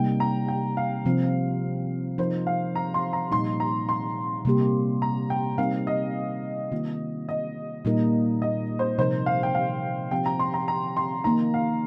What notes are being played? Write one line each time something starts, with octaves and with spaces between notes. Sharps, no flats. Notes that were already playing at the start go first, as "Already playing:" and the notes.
Already playing: C3 G3 A#3 D#4 G5
A#5
G5
F5
C3 F3 C4 F4
F3 D#4 A#4 C5
F5
A#5
C6
A#5
A#2 G3 D#4 C6
A#5
C6
C3 G3 A#3 G4
A#5
G5
G3 C4 D#4 A#4 F5
D#5
D#3 A#3 F4
D#5
A#2 G3 A#3 D#4 A#4
D#5
C5
C3 F3 D#4 A#4 C5
F5
G5
F5
F3 C4 G4 G5
A#5
C6
A#5
A#5
C6
D#3 A#3 D#4 A#5
F5